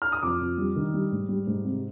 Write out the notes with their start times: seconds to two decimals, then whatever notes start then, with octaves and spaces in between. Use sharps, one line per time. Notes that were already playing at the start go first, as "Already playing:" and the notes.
0.02 F6
0.12 D#6
0.23 F2 D6
0.41 F2
0.58 G3
0.76 D#3
0.94 G3
1.12 G#2
1.29 G3
1.47 G#2
1.65 C3